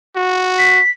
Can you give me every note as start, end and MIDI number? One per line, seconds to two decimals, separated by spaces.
0.16 0.80 66
0.58 0.90 95